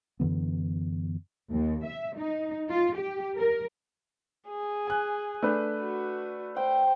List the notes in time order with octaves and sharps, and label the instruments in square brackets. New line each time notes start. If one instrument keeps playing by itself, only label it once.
[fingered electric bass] F#2 D3 E3 B3
[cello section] D#2
E5
D#4
F4
G4
A#4
[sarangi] G#4
[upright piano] G#5 F#6
A3 D4 B4
[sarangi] F#4
[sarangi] C5 [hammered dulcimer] G5